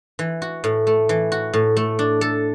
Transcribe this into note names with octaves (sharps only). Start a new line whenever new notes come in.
E3
F#4
A2
A3
E3
F#4
A2
A3
D4
A4